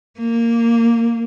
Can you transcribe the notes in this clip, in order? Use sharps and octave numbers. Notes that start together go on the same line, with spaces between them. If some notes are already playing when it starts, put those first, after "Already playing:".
A#3